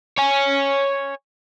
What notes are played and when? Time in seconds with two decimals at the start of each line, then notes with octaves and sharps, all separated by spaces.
0.18 C#5 G#5